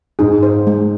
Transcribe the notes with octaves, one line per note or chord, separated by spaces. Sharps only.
G#2 G#4
C5
G#3